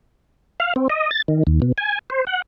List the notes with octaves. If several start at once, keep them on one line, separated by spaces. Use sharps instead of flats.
F5
C4
D#5
A6
D#3
D#2
B2
G#5
C5
F#5